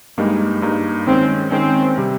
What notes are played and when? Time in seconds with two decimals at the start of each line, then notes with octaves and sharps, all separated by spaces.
0.18 G2 G3 G#3 A#3 D#4
0.62 G2 G3 A#3 D#4
1.06 D#3 G#3 C4 C#4
1.51 D#3 G#3 C4 C#4
1.98 C3 G3